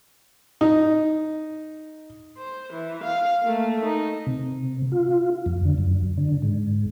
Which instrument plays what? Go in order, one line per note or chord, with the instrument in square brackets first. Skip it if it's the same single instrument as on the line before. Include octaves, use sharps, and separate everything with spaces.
[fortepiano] D#4
[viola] C5
E3
F5
A3 A#3
D#4
[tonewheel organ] C3
F4
F2
D3
F#2
D3
G#2